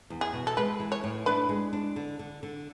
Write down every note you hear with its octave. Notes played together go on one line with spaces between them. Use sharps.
E2
G#4
B2
A4
G#3 B4
E3
C#5
A2
D4 B4
G#3
D4
D3
D3
D3